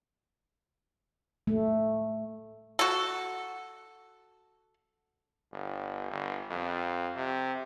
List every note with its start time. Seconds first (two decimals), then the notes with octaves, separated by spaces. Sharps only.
1.47 A3
2.79 F#4 A4
5.53 G1
6.11 G1
6.50 F2
7.16 C3